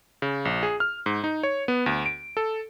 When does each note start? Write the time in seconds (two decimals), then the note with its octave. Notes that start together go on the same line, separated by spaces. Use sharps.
0.22 C#3
0.45 A#1
0.63 G#4
0.80 F6
1.06 G#2
1.24 D#4
1.43 C#5
1.68 B3
1.86 D2
2.06 D7
2.37 A4